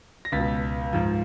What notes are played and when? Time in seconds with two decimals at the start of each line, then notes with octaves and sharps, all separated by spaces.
0.25 A#6
0.32 C#2 B2 A6 B6
0.93 G#2 F3